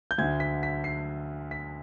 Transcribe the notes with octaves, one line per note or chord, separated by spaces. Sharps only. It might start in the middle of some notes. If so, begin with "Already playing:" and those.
G6
D2 D3 G#6
B6
B6
C7
B6